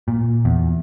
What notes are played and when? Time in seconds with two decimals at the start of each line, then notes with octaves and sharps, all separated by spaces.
0.08 A#2
0.45 E2